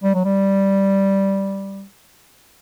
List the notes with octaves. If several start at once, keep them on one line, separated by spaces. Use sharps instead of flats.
G3
F#3
G3